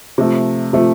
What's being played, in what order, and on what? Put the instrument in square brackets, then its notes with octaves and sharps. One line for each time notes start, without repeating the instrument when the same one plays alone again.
[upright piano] C3 F3 A3
C3 F3 A3